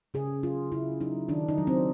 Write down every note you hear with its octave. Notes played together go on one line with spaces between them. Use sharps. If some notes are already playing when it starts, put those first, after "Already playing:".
C#3 G#4
F#3 F4
C#3 E4
F#3 D#4
D#3 D4
D#4
F#3
C4